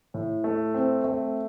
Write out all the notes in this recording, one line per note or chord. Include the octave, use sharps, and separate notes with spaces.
A2
A3
C4
A3